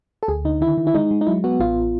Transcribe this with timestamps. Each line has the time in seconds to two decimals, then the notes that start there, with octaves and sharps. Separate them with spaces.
0.23 A4
0.28 D2 G#4
0.45 D3 D#4
0.61 D#3 E4
0.77 D#3
0.87 E4
0.94 G#3 D#4
1.11 G#3
1.21 D#4
1.27 F#3 E4
1.44 B3 F#4
1.60 A1 F4